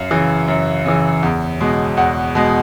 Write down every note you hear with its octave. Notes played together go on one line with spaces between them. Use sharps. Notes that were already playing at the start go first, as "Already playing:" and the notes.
Already playing: F#2 F5
C#3 E3
F#2
C#3 E3
E2
B2 G#3
E2 F#5
B2 G#3